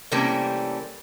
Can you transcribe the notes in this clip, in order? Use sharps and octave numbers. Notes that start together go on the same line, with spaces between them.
C3 E3 G3 A3 A#3 C#4